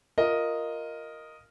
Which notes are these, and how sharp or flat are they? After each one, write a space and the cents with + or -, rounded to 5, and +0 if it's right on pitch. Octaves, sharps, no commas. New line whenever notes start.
F4 +0 A#4 +0 D#5 +0